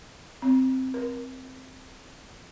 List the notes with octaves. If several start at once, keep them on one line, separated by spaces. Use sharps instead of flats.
C4
A#4